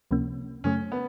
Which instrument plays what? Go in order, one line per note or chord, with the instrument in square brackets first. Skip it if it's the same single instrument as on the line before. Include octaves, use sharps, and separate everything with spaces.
[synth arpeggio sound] C#2 C3 F3 A#3 C#4
[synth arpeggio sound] F#2 C#3 F#3 A3 [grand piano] C#4
[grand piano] B3